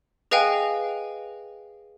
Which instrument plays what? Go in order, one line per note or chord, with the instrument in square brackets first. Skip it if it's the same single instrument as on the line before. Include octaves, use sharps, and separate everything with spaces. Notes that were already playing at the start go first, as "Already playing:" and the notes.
[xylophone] G#4 B4 D#5 F5 G5 G#5